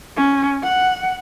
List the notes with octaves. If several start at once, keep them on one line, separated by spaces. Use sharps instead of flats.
C#4
F#5